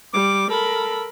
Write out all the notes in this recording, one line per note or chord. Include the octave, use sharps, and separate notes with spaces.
G3 D6
A4 A#4 B5